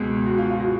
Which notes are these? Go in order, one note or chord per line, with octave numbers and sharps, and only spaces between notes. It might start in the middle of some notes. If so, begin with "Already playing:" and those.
Already playing: C#2 B2 G#3
F#4
F4
F4
F#4